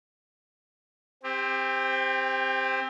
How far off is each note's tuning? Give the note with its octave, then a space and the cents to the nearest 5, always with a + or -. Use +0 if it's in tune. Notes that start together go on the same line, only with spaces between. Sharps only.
C4 +0 G4 +30